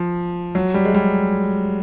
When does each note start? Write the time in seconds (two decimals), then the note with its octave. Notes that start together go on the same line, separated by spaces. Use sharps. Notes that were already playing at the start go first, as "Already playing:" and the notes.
Already playing: F3
0.55 F#3
0.74 G3
0.85 G#3
0.95 G3